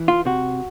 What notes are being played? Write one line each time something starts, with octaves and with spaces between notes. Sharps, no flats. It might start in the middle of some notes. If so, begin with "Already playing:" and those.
Already playing: E3
F4
C3 F#4